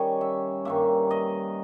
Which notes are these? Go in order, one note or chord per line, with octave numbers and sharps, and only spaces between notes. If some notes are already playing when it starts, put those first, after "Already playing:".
Already playing: D#3 G3 C#4 C#5 D#5
E5
G2 D#3 A#3 E5
D#5